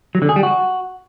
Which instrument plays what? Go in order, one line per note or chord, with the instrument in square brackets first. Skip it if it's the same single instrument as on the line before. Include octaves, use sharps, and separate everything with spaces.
[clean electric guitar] F#3
D3
G#4
G3
F#4